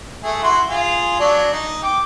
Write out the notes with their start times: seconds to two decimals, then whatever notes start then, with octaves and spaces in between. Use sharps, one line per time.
0.23 A3 G#4
0.43 E4 F#4 C6
0.70 F4 G#4
1.20 F#3 D4
1.52 D#4
1.83 G5 D6